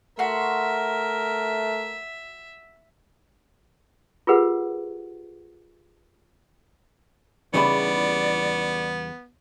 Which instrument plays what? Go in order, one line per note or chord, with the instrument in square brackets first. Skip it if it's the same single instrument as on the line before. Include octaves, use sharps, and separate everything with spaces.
[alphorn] A3 [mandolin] F#4 C6 [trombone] A#4 [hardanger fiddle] E5
[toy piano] F4 G4 G#4 A#4 B4 F#5
[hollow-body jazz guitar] E2 C#3 G3 [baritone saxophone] B3 [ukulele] D#4 B5 [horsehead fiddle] D5